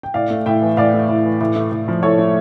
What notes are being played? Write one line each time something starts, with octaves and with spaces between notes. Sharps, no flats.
G5
A2 D5 F5
A3
A2 E5 G5
E3
A2 D5 F5
A3
A2
E3
A2
A3
A2
F3
A2 A4 C#5
A3